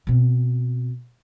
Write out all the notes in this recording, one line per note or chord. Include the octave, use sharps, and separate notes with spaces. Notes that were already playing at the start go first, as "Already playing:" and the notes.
B2 C4